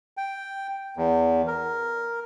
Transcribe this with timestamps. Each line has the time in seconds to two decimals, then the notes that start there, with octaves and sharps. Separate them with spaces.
0.17 G5
0.97 E2
1.48 A#4